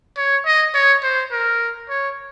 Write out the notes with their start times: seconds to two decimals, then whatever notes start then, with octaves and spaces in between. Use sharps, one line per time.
0.17 C#5
0.46 D#5
0.74 C#5
1.03 C5
1.32 A#4
1.89 C#5